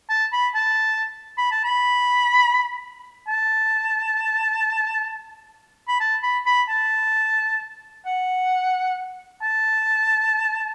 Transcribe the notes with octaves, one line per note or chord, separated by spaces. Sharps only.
A5
B5
A5
B5
A5
B5
A5
B5
A5
B5
B5
A5
F#5
A5